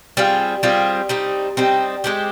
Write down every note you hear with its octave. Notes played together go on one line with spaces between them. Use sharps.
G3 C4 F4 G#4
G3 C4 F4 G#4
G3 C4 D#4
G3 C4 D#4
G#3 C4 G4